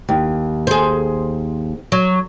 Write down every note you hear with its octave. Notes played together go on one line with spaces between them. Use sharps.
D#2
G#4 C5
F#3